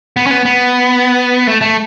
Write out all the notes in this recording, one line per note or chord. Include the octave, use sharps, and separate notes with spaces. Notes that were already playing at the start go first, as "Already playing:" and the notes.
B3
C#4
B3
B3
A3
A3